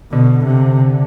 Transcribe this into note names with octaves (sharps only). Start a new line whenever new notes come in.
B2 D3
C3